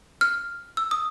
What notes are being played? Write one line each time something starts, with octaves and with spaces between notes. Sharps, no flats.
F6
E6
D#6